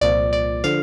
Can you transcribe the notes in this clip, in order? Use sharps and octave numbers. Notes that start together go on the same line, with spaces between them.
C2 A#2 F3 D5
D5
D3 F3 F5